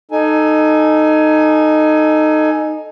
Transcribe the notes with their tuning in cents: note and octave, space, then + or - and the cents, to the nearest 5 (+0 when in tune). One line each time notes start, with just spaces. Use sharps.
D#4 -10 A4 +0 G#5 +15